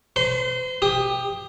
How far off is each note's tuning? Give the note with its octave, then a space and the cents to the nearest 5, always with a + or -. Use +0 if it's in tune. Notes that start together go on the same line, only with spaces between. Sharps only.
C5 -45 C6 -20
G4 +20 D#6 +0